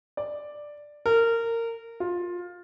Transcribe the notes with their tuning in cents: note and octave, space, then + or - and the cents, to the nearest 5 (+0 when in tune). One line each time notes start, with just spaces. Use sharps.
D5 +5
A#4 -20
F4 +15